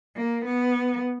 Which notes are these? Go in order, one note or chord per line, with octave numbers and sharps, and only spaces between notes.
A#3
B3